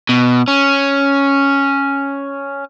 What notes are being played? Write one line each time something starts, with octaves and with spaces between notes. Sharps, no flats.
B2
C#4